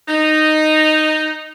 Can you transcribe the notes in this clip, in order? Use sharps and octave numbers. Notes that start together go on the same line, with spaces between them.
D#4